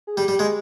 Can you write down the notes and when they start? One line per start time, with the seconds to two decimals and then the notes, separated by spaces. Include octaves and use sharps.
0.07 G#4
0.16 G3 G4
0.28 G3
0.39 G#3